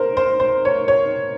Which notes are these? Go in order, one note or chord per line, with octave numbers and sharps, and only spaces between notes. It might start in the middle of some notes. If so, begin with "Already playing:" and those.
Already playing: A#4 C5
C5
C5
C#5
C#5